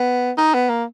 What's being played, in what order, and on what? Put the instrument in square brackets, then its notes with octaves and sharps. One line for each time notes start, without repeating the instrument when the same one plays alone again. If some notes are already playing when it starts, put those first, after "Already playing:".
Already playing: [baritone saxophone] B3
D#4
B3
A#3